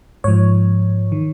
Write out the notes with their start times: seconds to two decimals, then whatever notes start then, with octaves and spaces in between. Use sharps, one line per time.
0.24 G#2 F3 C#5
1.12 D#3